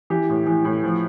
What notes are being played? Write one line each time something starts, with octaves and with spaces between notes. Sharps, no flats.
E3 G4
A2
E3
A2
F3